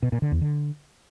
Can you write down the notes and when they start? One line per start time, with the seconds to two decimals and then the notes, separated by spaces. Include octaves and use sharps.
0.03 B2
0.12 A#2
0.22 D3
0.32 E2
0.41 D3